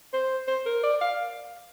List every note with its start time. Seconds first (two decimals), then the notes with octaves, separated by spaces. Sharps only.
0.13 C5
0.47 C5
0.66 A#4
0.83 D5
1.01 F5